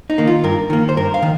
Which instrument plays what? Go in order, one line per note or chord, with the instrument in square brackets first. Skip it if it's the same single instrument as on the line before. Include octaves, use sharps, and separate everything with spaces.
[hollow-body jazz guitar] D#4
D#3 A#3
F4
G2 A#4
D#3 A#3
C5
G2 A#4
F5
D#3